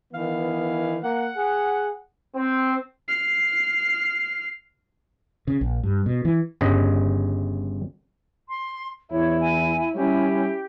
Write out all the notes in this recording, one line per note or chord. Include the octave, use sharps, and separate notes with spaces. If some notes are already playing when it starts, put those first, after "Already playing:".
D#3 E3 B3 F5
A#3 F#5
G#4
C4
F6 C7
C#3
A#1
G2
B2
E3
G1 G2 C#3 D#5
C6
E2 E4 C#5
G#5
G3 C#4 E4 G4